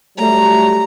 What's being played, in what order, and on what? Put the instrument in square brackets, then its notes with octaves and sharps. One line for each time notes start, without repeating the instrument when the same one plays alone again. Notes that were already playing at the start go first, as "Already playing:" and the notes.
[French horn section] F#3 G3 A3 [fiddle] A#5